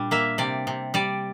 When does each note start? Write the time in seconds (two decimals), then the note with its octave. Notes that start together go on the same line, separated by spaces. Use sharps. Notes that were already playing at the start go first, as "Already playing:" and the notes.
Already playing: A#2 G3 D4
0.11 A#3 E5
0.38 C3 D5
0.67 C3
0.94 G3 D5